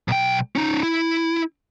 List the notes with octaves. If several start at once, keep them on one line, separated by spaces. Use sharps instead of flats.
B1 G5
C#4 D#4
E4